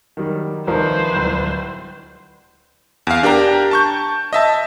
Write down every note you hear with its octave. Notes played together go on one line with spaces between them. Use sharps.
D#3 F#3 G3
C2 D#3 F3 B4 C5
D1 C2
E2 F5
D4 G4 A#4 G5 A#5
A5 C#6 G6
D#5 E5 A5